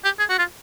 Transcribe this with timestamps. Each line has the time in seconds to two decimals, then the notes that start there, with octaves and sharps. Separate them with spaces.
0.05 G4
0.19 G#4
0.29 F#4
0.39 F4